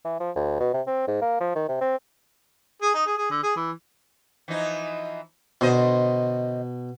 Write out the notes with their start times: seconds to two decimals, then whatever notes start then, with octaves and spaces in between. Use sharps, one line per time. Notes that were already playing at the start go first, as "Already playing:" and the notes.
0.05 E3
0.20 F3
0.36 D2
0.60 B2
0.73 C3
0.87 C4
1.07 G#2
1.21 A#3
1.40 F3
1.55 D#3
1.68 C3
1.81 C4
2.82 G#4
2.94 D#4
3.06 G#4
3.18 G#4
3.30 D3
3.43 G#4
3.56 E3
4.48 E3 F3 D#4
5.61 B2 D3 C5 D#5